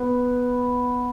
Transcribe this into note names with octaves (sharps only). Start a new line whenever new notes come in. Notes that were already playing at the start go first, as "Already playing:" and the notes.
Already playing: B3